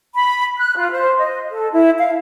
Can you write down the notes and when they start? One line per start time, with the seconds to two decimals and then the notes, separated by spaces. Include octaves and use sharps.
0.15 B5
0.59 F#6
0.77 F4
0.92 C5
1.19 D#5
1.51 A4
1.73 E4
1.98 F5